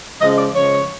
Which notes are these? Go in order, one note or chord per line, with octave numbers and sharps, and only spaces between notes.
C#3 F3 G#3 D#5
D5
C#3 F3 G#3 C#5